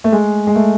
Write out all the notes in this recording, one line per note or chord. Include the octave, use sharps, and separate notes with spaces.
A3
G#3
G#3
A3